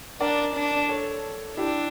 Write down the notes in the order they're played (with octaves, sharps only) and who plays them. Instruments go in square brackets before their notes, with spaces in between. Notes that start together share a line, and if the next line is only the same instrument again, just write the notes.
[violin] D4 [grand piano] A#4 D5
[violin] D4
[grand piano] A4 C#5
[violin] D4 [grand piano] E4 G4